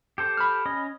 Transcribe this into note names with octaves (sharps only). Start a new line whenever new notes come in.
G4 A4 C5
B5 F6
C#4 D#5